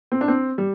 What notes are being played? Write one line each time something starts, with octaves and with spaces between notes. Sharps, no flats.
C4
D4
C4
G3